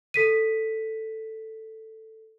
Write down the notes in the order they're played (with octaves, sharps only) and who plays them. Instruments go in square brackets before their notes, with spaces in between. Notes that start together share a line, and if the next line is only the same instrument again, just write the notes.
[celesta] A4 B6 D#7